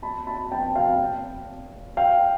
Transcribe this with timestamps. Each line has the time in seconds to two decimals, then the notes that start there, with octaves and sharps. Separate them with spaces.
0.03 A5 B5
0.27 A5 B5
0.52 G5 A5
0.76 F5 G5
1.97 F5 G5